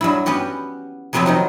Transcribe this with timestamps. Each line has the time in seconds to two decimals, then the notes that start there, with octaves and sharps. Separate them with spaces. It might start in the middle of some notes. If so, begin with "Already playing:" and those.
0.01 G2 F#3 E4
0.26 B3 C#4 F#4 G4
1.13 F2 C3 F#3 B3 C4 E5
1.26 D#3 F#3 D#4